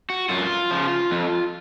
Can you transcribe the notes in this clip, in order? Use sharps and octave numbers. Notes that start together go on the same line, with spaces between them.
F#4
F#2 F4
C#3 F3
F2